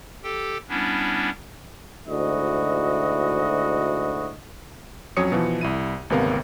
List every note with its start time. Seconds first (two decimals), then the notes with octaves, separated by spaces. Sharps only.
0.23 G4 A4 G5
0.69 G3 B3 C#4 D4 E4
2.08 D2 G#2 E4 F#4 D#5
5.17 F2 F#3 C#4 C#5 D#6 C#7
5.32 B2 E3 F3
5.61 C2 E4 D#7
6.10 G#1 D2 C3 B3 A#4 F5